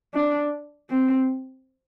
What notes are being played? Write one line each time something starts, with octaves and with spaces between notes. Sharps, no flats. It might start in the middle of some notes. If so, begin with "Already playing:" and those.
D4
C4